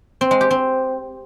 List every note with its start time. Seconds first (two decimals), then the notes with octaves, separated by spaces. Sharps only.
0.21 C4
0.31 G#3
0.41 G4
0.51 C4